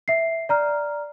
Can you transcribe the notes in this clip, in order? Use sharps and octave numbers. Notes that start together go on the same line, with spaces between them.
E5 C7
D5 A#5 F6